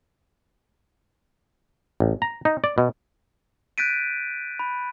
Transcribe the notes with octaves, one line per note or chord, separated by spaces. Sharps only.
A1
A#5
D#4
D5
B2
F#6 G6 A6 B6 D7 D#7
B5